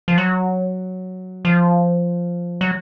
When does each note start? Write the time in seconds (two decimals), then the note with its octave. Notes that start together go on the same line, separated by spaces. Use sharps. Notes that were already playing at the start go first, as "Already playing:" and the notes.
0.08 F3
0.18 F#3
1.45 F3
2.61 F#3